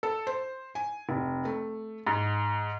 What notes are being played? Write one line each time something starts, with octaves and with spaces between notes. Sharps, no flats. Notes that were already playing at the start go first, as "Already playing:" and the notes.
A4
C5
G#5
F1
A3
G#2